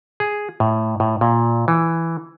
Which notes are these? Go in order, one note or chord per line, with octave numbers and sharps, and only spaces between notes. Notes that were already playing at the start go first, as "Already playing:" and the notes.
G#4
A2
A2
A#2
E3